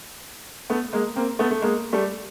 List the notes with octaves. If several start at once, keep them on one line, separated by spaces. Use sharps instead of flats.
A3 B3
G#3 A#3
A#3 C4
A3 B3
A3
G#3 A#3
G3 A3